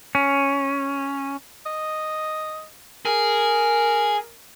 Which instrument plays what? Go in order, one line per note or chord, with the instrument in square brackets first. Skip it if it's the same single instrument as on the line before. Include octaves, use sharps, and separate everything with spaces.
[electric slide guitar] C#4
[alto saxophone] D#5
[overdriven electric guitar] G#4 [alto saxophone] A#4